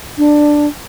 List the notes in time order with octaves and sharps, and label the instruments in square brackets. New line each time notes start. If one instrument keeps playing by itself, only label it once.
[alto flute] D4